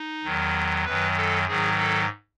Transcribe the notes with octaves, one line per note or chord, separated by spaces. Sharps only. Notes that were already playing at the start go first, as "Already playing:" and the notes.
Already playing: D#4
E2 D#3 F#3
F#2 D#3 F#3 B4
A4
G#2 D#3 F#3 G#4
A4